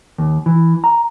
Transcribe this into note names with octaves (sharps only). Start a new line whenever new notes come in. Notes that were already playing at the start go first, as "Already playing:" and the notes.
D#2
E3
A#5